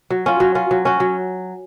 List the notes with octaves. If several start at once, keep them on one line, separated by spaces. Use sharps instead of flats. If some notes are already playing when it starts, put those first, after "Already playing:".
F#3
C#4 F4
F#3
C#4 F4
F#3
C#4 F#4
F#3